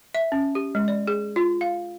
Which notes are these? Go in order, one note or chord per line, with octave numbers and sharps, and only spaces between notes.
E5
C#4
G4
G#3
D5
G#4
F4
F5